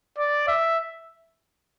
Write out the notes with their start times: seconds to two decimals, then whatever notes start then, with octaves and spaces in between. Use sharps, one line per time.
0.18 D5
0.48 E5